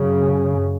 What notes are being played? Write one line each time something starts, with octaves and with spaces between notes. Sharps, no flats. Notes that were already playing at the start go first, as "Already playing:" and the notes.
Already playing: F#2 C#3